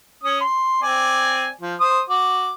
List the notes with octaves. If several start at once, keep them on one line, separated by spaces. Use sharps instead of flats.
C#4 D#6
C6
C4 D5 G#5
F3
C5 D#6
F#4 D6